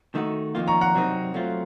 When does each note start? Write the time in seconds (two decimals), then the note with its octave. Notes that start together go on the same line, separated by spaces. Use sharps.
0.15 D#3 A3 D#4 F#4
0.55 F2 D#3 A#3 F4
0.68 A#5 C#6
0.81 F#5 A#5
0.95 C3 F#3 C4 D#4 A#4
1.34 F#3 A3 C4 F4